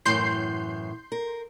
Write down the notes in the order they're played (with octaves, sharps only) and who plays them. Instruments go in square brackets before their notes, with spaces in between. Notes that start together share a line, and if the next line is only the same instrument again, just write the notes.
[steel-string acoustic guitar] F#2 A2 E3 [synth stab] C6 G6 C7
[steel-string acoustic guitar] A#4